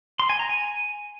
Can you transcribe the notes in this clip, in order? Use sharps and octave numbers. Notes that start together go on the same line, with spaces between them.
C6
G#5
A#5
G#5